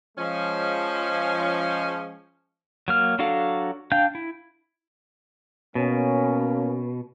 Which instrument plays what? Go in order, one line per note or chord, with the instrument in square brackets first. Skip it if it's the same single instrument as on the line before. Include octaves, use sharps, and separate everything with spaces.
[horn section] F3 G#3 C#4
[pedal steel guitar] F#3 A#3 F6
F#3 D4 F#4 A4 F5
D4 F5 G5 G6
E4
[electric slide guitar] B2 [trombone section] A#3 C#4